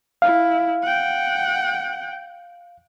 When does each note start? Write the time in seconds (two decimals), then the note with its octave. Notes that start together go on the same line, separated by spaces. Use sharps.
0.22 E4 F5
0.82 F#5 G5